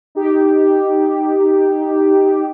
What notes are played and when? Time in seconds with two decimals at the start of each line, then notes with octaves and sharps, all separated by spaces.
0.15 D#4 G4